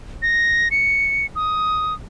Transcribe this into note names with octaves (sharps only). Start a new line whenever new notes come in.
A#6
C#7
D#6